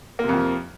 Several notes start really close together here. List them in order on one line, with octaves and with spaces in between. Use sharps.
A#3 C3 F2 F3